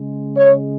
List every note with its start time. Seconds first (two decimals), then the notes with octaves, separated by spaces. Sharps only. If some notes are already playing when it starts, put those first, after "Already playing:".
Already playing: C#3 G#3
0.35 C#5